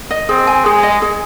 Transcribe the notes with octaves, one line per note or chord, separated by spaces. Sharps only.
D#5
C4 G#4
G#5
G#3 G#4
D#5
G#4